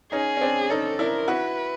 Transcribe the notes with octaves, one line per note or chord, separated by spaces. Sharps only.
C#4 D#4 G#4
C#4
C4 D4
C#4 D#4 A4
D4 E4 A#4
E4 F#4 B4